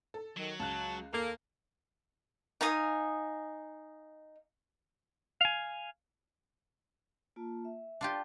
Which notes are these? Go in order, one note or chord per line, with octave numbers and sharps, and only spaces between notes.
A4
D#3 F#3
C#2 A5 F#6
D#2 A#3 A4
D#4 F5 G#5 D#6
F5 G#5
A#3 F4 A5
E5
D4 F4 G4 D5 G5